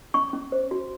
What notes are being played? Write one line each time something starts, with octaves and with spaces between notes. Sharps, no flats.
C#4 C#6
C#4
C5
F#4